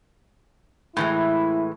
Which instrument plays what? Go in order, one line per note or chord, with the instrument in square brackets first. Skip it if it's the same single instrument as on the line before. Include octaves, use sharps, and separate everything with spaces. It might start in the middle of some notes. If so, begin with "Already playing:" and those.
[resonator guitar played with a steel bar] A2 E3 G#3 [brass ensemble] E4